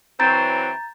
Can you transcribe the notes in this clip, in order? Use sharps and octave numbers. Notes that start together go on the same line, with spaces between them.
E3 F#3 C4 A#5 G6 A6